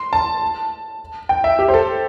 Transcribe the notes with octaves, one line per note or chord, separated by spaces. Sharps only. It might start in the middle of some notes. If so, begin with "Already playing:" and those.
Already playing: C6
A5
G5
E5
G4
C5
A4